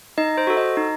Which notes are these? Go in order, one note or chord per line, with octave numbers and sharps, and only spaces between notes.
D#4 D#5
C5
F#4 A4
D#5
D#4